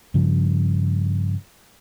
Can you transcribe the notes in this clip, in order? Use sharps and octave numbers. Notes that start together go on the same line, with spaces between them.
G2 C#3 F3